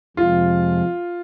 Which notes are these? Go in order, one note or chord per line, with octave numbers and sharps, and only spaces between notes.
F2 C3 F3 G#3 F4